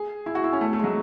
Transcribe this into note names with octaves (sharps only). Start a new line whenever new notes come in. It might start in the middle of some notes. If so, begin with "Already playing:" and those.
Already playing: G#4
E4
F#4
E4
C#4
A3
A3
G#3
F#3